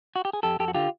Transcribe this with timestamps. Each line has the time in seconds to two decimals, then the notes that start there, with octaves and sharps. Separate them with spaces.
0.16 F#4
0.25 G4
0.33 G#4
0.43 F2 G4 A4
0.59 F2 G4 A4
0.68 F#4
0.74 D3 F4 G4